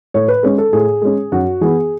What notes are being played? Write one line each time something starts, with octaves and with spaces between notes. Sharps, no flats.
A2 C#5
B4
G#3 C#4
A4
A2 G#4
G#3 C#4
F#2 F#4
E3 B3 G#4